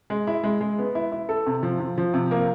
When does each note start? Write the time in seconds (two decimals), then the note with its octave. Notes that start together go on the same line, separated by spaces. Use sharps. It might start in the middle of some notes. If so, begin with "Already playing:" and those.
0.10 G#3
0.27 E4
0.44 G#3
0.61 G#3
0.79 B3
0.95 E4
1.12 E4
1.29 A4
1.46 C3
1.63 F3
1.80 F3
1.98 F3
2.14 C3
2.31 A#3